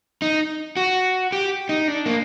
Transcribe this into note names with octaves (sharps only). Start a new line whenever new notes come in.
D#4
F#4
G4
D#4
D4
A#3